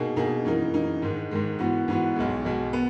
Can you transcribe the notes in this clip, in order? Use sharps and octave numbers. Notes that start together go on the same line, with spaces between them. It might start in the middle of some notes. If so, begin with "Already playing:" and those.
Already playing: B2 A#3 D#4 G#4
B2 A#3 D#4 G#4
F#2 E3 A#3 D#4
F#2 E3 A#3 D#4
G#2 D#3 G#3
G#2 D#3 G#3
G#2 E3 B3 F#4
G#2 E3 B3 F#4
B1 B2 G#3
B1 B2 G#3
B3